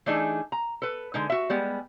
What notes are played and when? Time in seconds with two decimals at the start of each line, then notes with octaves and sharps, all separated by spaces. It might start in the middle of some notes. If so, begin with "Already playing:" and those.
0.06 E3 A3 D4 D#4 G#4
0.52 A#5
0.82 A4 B4
1.14 D3 G#3 D#4
1.30 F#4 E5
1.50 G3 G#3 B3